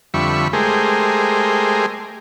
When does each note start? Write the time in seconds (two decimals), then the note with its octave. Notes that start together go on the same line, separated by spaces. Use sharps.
0.14 F2 D3 G3 E5 B5 C#6
0.53 G#3 A3 G4 G#4 A#4 C5